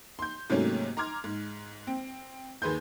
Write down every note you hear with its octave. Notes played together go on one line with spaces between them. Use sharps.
C6 G6
G#2 C3 F#3 A3 A#3 C#4
A#5 C6 D6 F6 G#6
G#2
C4
D#2 G#4 B4 C6 G6